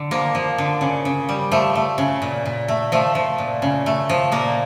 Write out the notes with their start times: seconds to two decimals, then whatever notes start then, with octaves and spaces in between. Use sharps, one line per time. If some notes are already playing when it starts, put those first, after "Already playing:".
Already playing: D3
0.11 F3 A#3
0.35 F3
0.58 D3
0.81 C#3
1.05 C#3
1.29 G3
1.51 F3 A3
1.75 A3
1.98 C#3
2.22 A#2
2.45 A#2
2.68 A3
2.92 F3 A3
3.15 F3
3.38 A#2
3.62 C#3
3.86 A3
4.09 F3
4.32 A#2 A#3